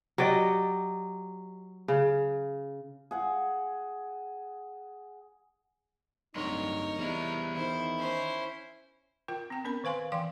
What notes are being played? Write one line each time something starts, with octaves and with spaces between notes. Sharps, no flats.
F#3 G4 D5 D#5
C#3
G#4 F#5
D1 G2 D#4 A#4 C#5 C6
E2 G3 E4
D#3 E4 C5
C#4 C5
F4 A#4 G5
C4 G5
B3 C#4 A#4 B5
D#3 B4 F5 G#5 C6
E3 F5 G5 C6